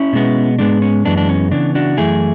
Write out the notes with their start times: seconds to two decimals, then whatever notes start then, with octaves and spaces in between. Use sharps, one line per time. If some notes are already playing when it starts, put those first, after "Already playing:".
Already playing: C#4 E4
0.13 B2 G#3 B3
0.59 G#2 G#3 B3 D4
0.82 C#4
1.05 F#2 E3 G#3 B3 D4
1.17 D4
1.29 C#4
1.51 C#3 E3 B3 D4
1.75 D4 F#4
1.97 F#2 E3 A3 E4 G#4